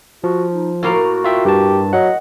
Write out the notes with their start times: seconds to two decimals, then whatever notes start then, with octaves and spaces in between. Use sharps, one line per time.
0.24 F3 F#4
0.52 D#4
0.83 A2 A#3 F#4 A#4
1.24 F4 E5 G5
1.45 G2 G4 A5
1.93 F#3 D#5 F#5